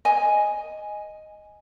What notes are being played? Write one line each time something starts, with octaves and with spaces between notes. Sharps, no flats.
D#5 G#5